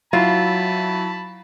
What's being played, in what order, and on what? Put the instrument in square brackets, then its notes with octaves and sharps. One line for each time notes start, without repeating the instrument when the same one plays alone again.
[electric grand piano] F#3 E4 [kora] F4 [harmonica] A5 B5